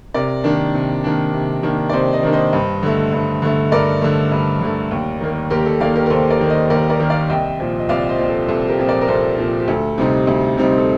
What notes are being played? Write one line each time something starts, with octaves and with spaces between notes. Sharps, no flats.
C3 A#4 D5
D#3 A#3 D4
C3
D#3 A#3 D4
C3
D#3 A#3 D4
D5
C3 C5 D#5
C5 D#5
D#3 A#3 D4
C5 D#5
G2
D3 A3
G2
D3 A3
G2 A#4 D5
D3 A3
G2
D3 A3
D#2
D#3 A#3
D#2 G4 A#4
A4
D#3 A#3 D5 F5
G4 A#4
A#4
D#2 A4 C5
A#4 D5
D#3 A#3
C5 D#5
D#2 A#4 D5
A#4 D5
D#3 A#3
D5 F5
C2 D#5 G5
A#2 F3 C4
D#5
C2 D5 F5
C5 D#5
A#2 F3 C4
A4
C2 A4
G4 A#4
A#2 F3 C4
A#4 D5
A#4
C2 A4 C5
A#2 F3 C4
G4
D2 A4
C3 G3 C4 D#4
D2
C3 G3 C4 D#4
A4